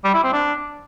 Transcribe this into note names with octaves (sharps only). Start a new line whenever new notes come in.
G3
E4
C4
D4